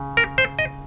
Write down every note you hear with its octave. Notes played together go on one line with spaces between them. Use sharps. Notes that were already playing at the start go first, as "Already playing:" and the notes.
Already playing: C#3
A#4
C5
D#5